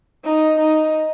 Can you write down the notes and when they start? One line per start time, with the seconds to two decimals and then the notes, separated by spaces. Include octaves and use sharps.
0.24 D#4
0.59 D#4